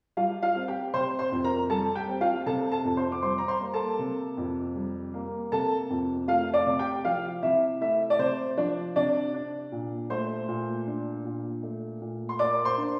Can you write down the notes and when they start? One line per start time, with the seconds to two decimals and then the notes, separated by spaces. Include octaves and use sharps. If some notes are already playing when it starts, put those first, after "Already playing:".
0.17 G3 F4 F5
0.42 F4 F5
0.55 C4
0.68 G4 G5
0.94 C3 C5 C6
1.19 C5 C6
1.32 F2
1.44 A#4 A#5
1.70 G3 A4 A5
1.95 G4 G5
2.08 C4
2.21 F4 F5
2.46 C3 A4 A5
2.72 A4 A5
2.84 F2
2.97 C5 C6
3.12 D6
3.22 G3 C5 C6
3.38 A#5
3.48 C5 C6
3.61 A#3
3.74 A4 A5
3.99 C3
4.37 F2
4.76 G3
5.14 A#3
5.52 C3 A4 A5
5.90 F2
6.28 A3 F4 F5
6.54 D5 D6
6.66 C3
6.79 G4 G5
7.05 F3 F4 F5
7.43 C3 E4 E5
7.81 A3 E4 E5
8.10 D5
8.19 C3 C5
8.57 F3 D4 D5
8.96 C3 D4 D5
9.34 D4
9.72 A#2
10.10 A3 C5 C6
10.48 A#2
10.87 D4
11.25 A#2
11.63 A3
12.01 A#2
12.29 C6
12.39 A#3 D5 D6
12.65 C5 C6
12.78 D4